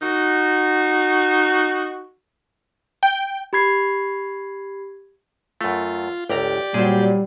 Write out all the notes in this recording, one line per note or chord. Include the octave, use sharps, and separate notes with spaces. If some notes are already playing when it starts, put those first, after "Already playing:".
D#4 F#4
G5
G4 B5 G#6 C7
F#2 A3 F4
G1 C#2 G4 D5 A#5
A#2 F#3 G3 G#4 C5